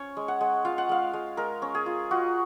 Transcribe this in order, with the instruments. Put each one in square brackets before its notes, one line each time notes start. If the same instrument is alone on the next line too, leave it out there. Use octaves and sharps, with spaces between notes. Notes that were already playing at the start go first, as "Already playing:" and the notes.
Already playing: [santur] C#4 C#5
G#3
F#5
G#3
F4 F5
F#5
G#3 F5
G#3
G#3 A#4
C#4
G#4
F4
F4 F#4